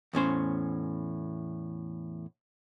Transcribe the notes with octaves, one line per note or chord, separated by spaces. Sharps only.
E2 A2 C#4 C5